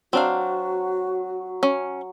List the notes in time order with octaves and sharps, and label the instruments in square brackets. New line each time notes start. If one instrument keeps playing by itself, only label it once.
[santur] F#3 [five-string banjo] C4 D4 F5 [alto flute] F#4
[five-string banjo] C#4